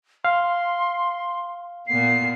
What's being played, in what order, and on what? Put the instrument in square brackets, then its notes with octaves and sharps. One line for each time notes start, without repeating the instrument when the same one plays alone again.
[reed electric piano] F5 [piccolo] C6
[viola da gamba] A#2 B3 [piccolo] C7